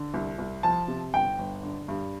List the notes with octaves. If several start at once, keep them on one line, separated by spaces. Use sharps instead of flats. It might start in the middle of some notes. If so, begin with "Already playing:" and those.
Already playing: D3
C2
C2
F3 A5
C3
G1 G5
G1
D3
G2